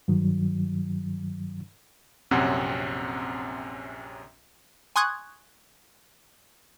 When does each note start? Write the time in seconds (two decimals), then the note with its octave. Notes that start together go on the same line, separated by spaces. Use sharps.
0.08 G2 D#3 F#3
2.31 A#1 F#2 C3 C4 C#4 F#5
4.96 G#5 C6 C#6 D#6 F#6 G#6